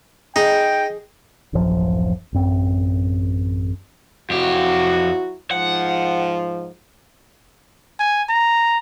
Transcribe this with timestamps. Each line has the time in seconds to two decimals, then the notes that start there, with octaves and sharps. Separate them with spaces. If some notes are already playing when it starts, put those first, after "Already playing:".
0.36 D#4 G#4 G5
1.53 D1 A1 F#2 F3
2.33 A1 F#2 C4
4.30 F2 F#3 E4 F#4 G4
5.51 G#2 F3 F#5
8.00 G#5
8.29 A#5